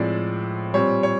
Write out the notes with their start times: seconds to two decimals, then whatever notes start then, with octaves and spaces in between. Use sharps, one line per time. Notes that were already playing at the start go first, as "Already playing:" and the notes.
Already playing: A2 F3 G#3 C4 D5
0.74 A#2 G3 C4 C#5
1.03 C#5